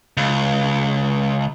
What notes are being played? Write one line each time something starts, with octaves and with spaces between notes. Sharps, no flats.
C#2